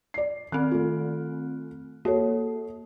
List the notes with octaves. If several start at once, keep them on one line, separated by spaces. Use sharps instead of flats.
D5 C7
D#3 C4 F#6
A3 F4
A#3 F#4 A4 C#5